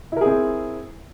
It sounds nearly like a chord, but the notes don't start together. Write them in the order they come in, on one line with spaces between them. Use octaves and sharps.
E4 A#4 G#4 C4